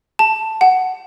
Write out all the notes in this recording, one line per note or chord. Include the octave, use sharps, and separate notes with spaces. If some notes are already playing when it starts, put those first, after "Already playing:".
A5
F#5